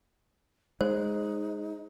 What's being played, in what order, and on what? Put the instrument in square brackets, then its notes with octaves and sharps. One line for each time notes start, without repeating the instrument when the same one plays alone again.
[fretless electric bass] G#3 [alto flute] D#4 [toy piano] C5